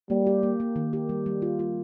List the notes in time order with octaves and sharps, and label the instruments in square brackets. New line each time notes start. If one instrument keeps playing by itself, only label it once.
[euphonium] G3 [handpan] A#3
[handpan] G4
A#3
A#3
D#3
G4
G3
G3
F4
F4